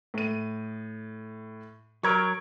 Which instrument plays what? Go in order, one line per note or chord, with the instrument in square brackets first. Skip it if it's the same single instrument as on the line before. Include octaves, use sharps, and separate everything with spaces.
[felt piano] A2 D#7
[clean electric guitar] F#3 A#4 [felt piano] C#6 G#6 D7